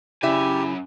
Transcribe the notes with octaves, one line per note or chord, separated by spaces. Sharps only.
F#2 C#3 E4 G4 E5 G#5